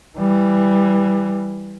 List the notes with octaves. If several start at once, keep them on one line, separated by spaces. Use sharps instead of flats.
E3 G3